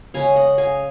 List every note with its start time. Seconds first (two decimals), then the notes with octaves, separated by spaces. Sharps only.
0.14 C#3 G#3 C#4 F5 G#5
0.36 D#5 F#5
0.58 F5 G#5